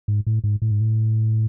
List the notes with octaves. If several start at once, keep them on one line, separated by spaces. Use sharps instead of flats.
G#2
A2
G#2
A2
G#2
A2